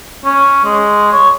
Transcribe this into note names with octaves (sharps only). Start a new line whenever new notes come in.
C#4
G#3
C#5